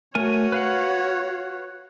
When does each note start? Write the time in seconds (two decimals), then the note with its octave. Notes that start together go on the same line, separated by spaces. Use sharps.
0.15 A3 F#4 A#4 C#5 G#5
0.52 B4 F5 F#5